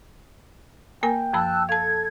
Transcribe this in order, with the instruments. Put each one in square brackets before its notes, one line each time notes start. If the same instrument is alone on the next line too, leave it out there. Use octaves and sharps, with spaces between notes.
[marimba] A#3 A#4 G#5 [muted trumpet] G5
[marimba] F#2 F3 B5 [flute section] A5 E6 F#6
[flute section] A4 G#6 [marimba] F5 A5